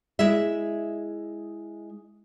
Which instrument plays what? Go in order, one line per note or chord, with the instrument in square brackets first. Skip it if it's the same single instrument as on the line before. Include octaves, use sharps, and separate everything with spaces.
[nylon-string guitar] G#3 E4 G#4 E5